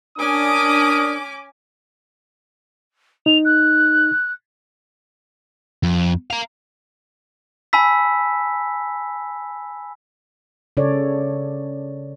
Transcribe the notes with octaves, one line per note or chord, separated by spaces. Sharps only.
C#4 D4 A#4 G#5 D6 D#6
D#4 F7
F#6
F2
F5 A#5
G#5 A5 B5 E6 B6
C#3 D4 A4 C#5 D5